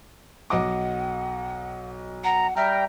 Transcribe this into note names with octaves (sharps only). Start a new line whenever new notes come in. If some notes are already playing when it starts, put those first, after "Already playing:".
B1 D#5 F#5 D6
F#5 A#5
G3 E5 G5 A#5 F6